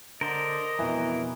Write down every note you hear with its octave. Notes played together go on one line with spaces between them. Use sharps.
D3 A#4 C5 D5 D#5
F2 B2 E3